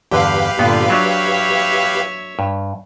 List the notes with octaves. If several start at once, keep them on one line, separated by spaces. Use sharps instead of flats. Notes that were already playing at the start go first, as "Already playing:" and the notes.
E2 G2 D3 G4 B4 F5
G2 A#2 D3 B3
F#3 D4 C#5 E5
G2